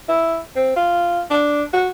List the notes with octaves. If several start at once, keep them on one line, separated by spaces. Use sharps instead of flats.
E4
C4
F4
D4
F#4